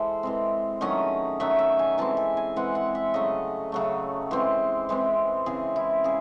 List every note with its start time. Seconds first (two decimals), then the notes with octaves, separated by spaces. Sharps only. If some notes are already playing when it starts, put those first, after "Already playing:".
Already playing: E3 G#3 A4 C5
0.23 E3 G#3 C4
0.81 D#3 F#3 A3 C#4 D#5
1.40 D#3 F#3 A3 C#4 E5
1.59 E5
1.79 G#5
1.98 E3 G#3 C4 A5
2.17 G#5
2.37 G#5
2.56 E3 G#3 C4 F#5
2.75 F#5
2.95 E5
3.14 C#3 F#3 A3 D#5
3.72 C#3 F#3 A3
4.31 E3 G#3 C4
4.89 E3 G#3 C4
5.46 C#3 E3 C4 G#4
5.76 E4
6.04 C#3 G#4